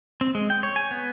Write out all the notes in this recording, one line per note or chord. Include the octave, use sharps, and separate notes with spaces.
C4
G#3
G5
C#5
G#5
B3